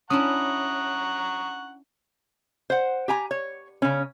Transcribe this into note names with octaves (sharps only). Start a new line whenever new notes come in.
C#4 D4 E4 F#5 A#5 C#6 D#6
C5 F#5
G4 G#5 A#5
C#5
C#3 C#4